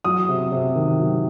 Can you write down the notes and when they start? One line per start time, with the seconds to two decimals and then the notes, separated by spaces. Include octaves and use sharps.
0.04 F#3 D#6
0.28 C3
0.52 C3
0.75 D#3
0.99 F#3